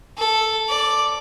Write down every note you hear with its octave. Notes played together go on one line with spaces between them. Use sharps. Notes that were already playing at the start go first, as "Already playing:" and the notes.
A4
D5